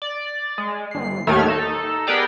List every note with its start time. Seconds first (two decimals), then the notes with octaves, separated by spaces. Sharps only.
0.02 D5
0.58 G#3
0.91 G1 C7
1.27 D#2 A2 D#3 A3 F6 G#6
1.48 D#4 A4
2.07 B3 G4 G#4 A#4 D5 G5